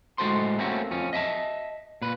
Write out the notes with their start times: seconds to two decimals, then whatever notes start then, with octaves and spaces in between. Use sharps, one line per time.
0.18 A2 G#3 F#4 A4 C5 C6
0.59 A3 A#3 C4 C#4 F#4
0.91 F2 F3 C#4
1.13 D#5 E5 G#5 A5
2.02 A#2 B4